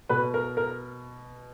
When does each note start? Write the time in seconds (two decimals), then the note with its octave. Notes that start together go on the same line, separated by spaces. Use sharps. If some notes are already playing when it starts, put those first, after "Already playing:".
0.09 B2 B4
0.34 A#4
0.57 A#4